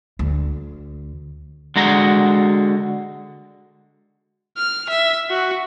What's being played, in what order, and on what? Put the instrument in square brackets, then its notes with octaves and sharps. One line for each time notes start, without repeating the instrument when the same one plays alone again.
[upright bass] D2
[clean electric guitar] D3 G#3 F#4 A#5
[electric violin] F6
E5
F#4